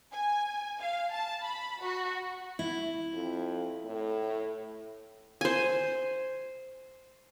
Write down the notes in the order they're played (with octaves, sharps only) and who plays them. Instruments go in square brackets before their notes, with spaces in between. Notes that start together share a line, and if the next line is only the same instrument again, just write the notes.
[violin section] G#5
F5
A5
B5
F#4
[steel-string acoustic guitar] E4
[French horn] F2
A2
[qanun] C5 G#5